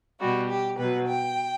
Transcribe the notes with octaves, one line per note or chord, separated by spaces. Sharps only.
B2 G3 F#4
G4
B2 F#3 B4
G5